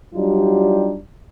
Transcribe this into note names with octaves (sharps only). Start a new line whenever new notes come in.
F#3 G3 D4 D#4 F4 G4